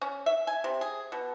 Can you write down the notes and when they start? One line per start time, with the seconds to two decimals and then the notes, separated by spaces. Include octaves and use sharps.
0.02 C#4
0.26 E5
0.47 G#5
0.64 C3
0.81 G#4
1.12 B2